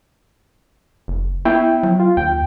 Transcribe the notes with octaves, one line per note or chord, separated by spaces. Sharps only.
F#1
B3 E4 G5
F#3
F4
D#2 G5